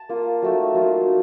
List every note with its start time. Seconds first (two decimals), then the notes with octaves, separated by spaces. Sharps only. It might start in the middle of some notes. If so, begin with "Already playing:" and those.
Already playing: A5
0.09 A#3 F4
0.42 F#3 A3 D#4
0.75 F#3 A#3 F4
1.07 D#4